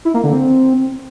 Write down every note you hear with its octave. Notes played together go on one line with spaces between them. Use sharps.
E4
A#3
D3
C4